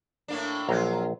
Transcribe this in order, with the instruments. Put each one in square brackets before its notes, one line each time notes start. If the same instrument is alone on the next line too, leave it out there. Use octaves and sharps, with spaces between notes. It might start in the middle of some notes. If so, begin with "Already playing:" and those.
[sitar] A2 A#3 D4
[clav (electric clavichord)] A#1 A#5 [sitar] F#3 F4